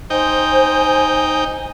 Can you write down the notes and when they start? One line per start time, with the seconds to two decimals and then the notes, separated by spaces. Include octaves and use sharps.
0.10 D#4 C5 G5 G#5